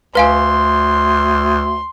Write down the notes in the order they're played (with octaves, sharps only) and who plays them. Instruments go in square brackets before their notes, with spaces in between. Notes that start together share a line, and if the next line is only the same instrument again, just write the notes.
[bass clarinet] D2 [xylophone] B4 F5 G#5 [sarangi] C6